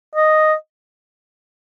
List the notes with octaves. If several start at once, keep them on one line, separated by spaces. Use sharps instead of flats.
D#5